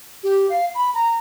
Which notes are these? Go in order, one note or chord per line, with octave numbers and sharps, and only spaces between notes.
G4
F5
B5
A#5